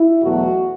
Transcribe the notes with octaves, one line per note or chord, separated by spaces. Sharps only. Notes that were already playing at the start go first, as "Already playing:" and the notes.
Already playing: E4
E2 B2 F#3 A3 F#4